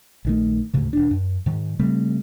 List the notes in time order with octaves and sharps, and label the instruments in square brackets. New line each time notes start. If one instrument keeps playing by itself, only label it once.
[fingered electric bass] A#1 D#3 A3
D2 G#2 C#3
D#1 D4
F#2
G#2 D#3
C#3 G3 A3 C4